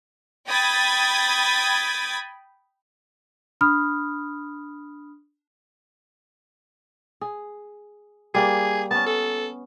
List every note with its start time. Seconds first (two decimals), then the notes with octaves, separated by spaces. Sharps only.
0.48 G5 B5 D#6 G#6 A6
3.61 D4 B5 D#6 F6
7.21 G#4
8.35 G3 A#3 G#4
8.91 B3 C#4 A5
9.06 A4